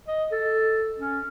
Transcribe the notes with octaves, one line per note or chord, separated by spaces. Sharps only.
D#5
A4
C#4